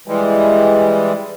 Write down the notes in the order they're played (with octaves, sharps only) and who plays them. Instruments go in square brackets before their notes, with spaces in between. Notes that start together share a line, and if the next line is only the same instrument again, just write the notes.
[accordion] E3 G3 G#3